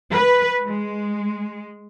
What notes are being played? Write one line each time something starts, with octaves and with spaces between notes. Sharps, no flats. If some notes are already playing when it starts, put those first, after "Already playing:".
B4
G#3